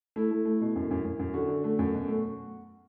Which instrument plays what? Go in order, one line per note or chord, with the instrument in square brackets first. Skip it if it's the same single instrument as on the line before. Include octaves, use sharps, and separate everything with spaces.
[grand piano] A3 E4
A3
A3
B2
F#2
F#2
F#2
F#2
D3 F#4
D3
A3
F#2
B2
A3